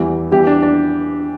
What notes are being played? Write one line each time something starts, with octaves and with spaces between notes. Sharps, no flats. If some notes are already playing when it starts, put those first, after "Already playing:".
Already playing: E2 E3 G3
E2 E3 G3 G4
D4
D4